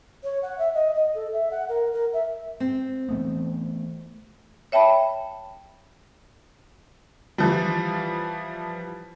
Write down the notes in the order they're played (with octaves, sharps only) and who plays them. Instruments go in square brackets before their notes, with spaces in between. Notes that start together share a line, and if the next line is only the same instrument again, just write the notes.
[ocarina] C#5
F#5
E5
D#5
D#5
A4
E5
F#5
A#4
A#4
E5
[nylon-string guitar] C4
[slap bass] E3 A3 B3
[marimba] C#5 E5 G5 A5 B5
[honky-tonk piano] E3 F3 G3